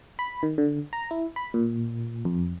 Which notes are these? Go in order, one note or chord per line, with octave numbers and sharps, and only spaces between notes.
B5
D#3
D3
A#5
E4
B5
A#2
F2